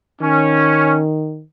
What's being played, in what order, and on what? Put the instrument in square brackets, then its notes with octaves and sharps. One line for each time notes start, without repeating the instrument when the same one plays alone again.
[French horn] D#3 [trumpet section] C#4